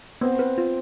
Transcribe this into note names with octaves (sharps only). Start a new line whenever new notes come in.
B3 C4
B4
F4